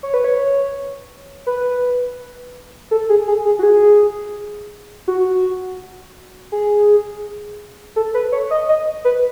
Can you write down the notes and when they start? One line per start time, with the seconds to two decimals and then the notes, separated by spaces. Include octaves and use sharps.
0.03 C#5
0.14 B4
0.24 C#5
1.47 B4
2.91 A4
3.09 G#4
3.28 G#4
3.45 G#4
3.59 F#4
3.63 G#4
5.08 F#4
6.52 G#4
7.96 A4
8.14 B4
8.32 C#5
8.51 D#5
8.69 D#5
9.05 B4